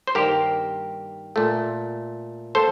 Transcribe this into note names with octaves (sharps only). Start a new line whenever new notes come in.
C5
G2 D#3 G3 A#3 G4 A#4
A#2 A3
A#3 A4 C5